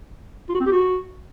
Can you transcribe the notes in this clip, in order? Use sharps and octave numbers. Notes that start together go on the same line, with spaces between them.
F4
F#4
C4
G4
F#4